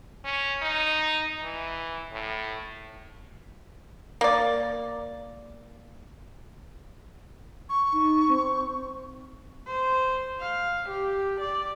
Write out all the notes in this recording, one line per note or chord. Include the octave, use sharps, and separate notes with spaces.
C#4
D#4
E3
A2
A#3 D5
C#6
D#4
C4
C5
F5
G4
D5